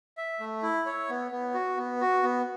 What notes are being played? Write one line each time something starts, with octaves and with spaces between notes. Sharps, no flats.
E5
A3
E4
C#5
B3
B3
F#4
B3
F#4
B3